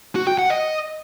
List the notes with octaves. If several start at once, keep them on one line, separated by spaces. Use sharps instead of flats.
F#4
G5
F#5
D#5